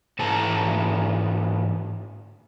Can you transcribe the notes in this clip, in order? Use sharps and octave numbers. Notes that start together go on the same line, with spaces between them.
G#2 E3 A4 B4 A5 A#5